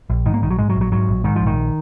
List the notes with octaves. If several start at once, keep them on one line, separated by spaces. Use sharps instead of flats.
A#1
G#2 D#3
A#3
A#1 D#3
F#3
G#2 G#3
F#3
A#1
F#3
G#2 F#3
A#1
G#2 D#3
A#1 F3
D#3